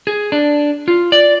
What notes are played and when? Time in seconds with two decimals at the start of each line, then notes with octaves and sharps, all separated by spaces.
0.07 G#4
0.32 D4
0.88 F4
1.12 D5